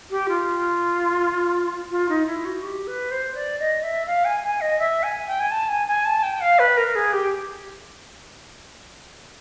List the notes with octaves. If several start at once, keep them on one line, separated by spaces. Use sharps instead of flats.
G4
F4
F4
D#4
E4
F#4
G4
B4
C5
D5
D#5
E5
F5
G#5
G#5
D#5
E5
G#5
G5
G#5
A5
G#5
G#5
A5
G5
F5
B4
A#4
G#4
G4